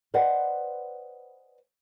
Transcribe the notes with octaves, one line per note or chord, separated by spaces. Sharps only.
B4 C5 D5 D#5 F#5 G#5